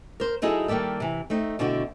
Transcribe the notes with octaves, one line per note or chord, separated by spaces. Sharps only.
A#4 C5
F#3 D#4 E4 G#4 A4
D#3 G3 A#3 G4 A4
C3 E3
A3 C4 D#4
B2 D3 C4 E4 F#4